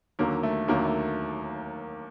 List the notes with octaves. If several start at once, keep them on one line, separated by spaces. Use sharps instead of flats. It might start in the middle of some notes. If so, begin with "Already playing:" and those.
D#2 D3 F#3 A#3
A3
D#2 D3 F#3 A#3
A3